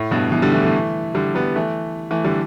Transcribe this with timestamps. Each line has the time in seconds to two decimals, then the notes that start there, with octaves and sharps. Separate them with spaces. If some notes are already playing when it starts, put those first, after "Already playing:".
Already playing: A2
0.11 G2 B2
0.32 B2 E3
0.42 D3 G3
0.52 E3 A3
0.63 E3 A3
1.15 D3 G3
1.35 G3 B3
1.56 E3 A3
2.11 E3 A3
2.24 D3 G3